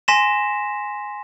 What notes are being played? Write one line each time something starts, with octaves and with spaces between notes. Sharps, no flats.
G#5 C6 A#6 B6 E7